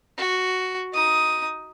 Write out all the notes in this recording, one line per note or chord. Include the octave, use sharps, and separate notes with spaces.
F#4
D#4 D#6